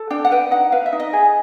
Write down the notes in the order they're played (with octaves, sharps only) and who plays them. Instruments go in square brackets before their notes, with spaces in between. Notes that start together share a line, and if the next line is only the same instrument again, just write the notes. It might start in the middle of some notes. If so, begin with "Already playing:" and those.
Already playing: [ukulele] A4
D4 G5
F#5
B4 G5
D#4 F#5
B4 F5
E5
D#4
D#5
G#4